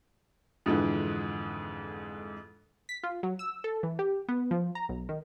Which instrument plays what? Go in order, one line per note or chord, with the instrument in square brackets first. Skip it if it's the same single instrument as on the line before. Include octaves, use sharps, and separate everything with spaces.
[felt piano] F2 G#2 D3 E3
[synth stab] B6
F4
F#3
E6
A4
E3
G4
B3
F3
A#5
B1
D#3